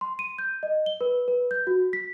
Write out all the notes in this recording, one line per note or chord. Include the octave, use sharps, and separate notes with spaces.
C6
D#7
G6
D#5
G7
B4
B4
G6
F#4
B6